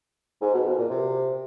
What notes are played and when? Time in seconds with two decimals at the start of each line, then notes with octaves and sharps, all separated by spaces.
0.42 G#2
0.54 B2
0.66 F2
0.78 A#2
0.90 C3